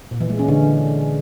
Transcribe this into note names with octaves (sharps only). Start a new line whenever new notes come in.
A#2
E3
G#3
C#4
D3